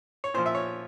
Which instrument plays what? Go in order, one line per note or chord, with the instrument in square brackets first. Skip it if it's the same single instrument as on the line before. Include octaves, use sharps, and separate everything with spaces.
[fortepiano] C#5
A#2 C5
F3
E5
C#5